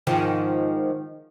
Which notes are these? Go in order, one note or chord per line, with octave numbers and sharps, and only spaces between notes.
G#2 D#3 F3